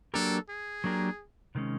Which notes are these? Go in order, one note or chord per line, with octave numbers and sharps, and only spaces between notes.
F#3 A#3 D4 G4 A4 A#4
G#4
F#3 A#3 D4 G4 A#4
C3 D#3 G#3 C#4